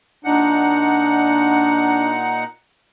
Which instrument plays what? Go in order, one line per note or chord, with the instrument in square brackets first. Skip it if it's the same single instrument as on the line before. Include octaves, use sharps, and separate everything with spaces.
[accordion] A#2 D#4 F#5 [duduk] D4